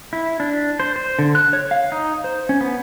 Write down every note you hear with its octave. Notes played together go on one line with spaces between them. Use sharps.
E4
D4
C5
C5
D3
F#6
C#5
F5
D#4
C5
C#4
B3